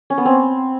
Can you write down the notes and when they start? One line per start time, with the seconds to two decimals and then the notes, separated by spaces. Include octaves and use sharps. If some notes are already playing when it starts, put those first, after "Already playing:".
0.10 C#4
0.18 B3
0.25 C4